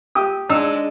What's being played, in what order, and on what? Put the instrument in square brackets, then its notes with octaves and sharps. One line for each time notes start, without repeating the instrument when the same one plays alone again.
[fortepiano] G4 D#6
[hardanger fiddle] G#3 D4 [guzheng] D#4 [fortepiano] E6